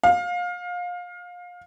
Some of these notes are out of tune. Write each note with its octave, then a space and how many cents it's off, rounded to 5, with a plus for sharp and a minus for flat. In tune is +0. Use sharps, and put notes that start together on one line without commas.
F5 +25